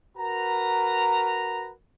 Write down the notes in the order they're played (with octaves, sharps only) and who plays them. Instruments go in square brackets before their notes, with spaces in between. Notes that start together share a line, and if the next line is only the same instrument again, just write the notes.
[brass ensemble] F#4 A#4 B4 A#5